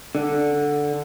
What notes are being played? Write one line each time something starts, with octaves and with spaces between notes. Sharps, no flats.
D3